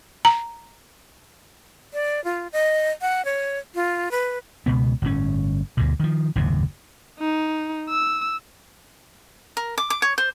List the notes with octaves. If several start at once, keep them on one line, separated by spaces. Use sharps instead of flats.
A#5
D5
F4
D#5
F#5
C#5
F4
B4
C#2 B2 B3
G1 A2 C#4
D2 G2 B2
D#3 F3
F#1 D#2 G#2 C3
D#4
E6
A#4
D6
D6
C#5
C5